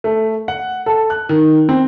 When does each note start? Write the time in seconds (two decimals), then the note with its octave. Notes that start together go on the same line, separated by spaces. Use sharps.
0.04 A3
0.48 F#5
0.86 A4
1.10 F#6
1.29 D#3
1.69 C4